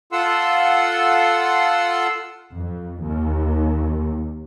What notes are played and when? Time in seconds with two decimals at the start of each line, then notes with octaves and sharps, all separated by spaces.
0.12 F4 A4 F#5 C6 E6
2.55 F2
3.03 D#2